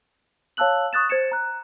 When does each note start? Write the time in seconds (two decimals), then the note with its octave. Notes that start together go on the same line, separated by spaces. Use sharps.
0.57 C#5 F5 A5 E6 F#6 F#7
0.93 C#6 D#6 F#6 A6 E7
1.09 C5 G#6 A6 C#7 E7
1.32 A#5 F#6